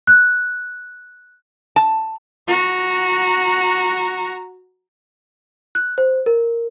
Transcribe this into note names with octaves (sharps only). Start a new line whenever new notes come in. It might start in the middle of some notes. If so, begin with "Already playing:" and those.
F#6
A5
F#4 A#5
F#6
C5
A#4